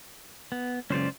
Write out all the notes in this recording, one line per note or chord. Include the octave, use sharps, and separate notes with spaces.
B3
C#2 F#2 C#3 C#4 C5 D5